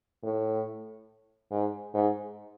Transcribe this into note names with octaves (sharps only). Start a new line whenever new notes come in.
A2
G#2
G#2